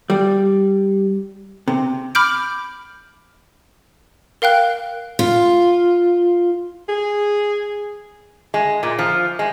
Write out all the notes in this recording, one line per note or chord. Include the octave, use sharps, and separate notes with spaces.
G3
C3
B5 D6 F6 G6 D7
A#4 F5 G5 F#6
F4
G#4
G#3
A#2
F3
G#3